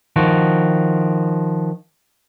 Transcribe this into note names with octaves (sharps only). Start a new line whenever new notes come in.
D#3 F3 F#4